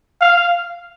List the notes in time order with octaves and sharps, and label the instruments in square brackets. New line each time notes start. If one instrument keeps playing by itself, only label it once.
[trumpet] F5